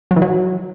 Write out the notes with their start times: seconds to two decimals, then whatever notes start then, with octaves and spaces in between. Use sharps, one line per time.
0.11 F#3
0.16 E3
0.22 F#3